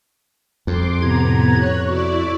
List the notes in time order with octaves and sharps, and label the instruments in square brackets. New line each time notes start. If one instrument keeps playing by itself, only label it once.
[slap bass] F2 [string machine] C6 D6
[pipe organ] A2 C3 G#6 [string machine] B3 A#5
[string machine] C#5 F#6
[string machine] E4 D5 [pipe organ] F#4